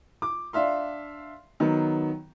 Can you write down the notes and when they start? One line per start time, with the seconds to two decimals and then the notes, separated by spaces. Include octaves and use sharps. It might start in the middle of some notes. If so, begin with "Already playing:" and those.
0.22 D6
0.53 D4 E5 F5 C6
1.60 D#3 F#3 B3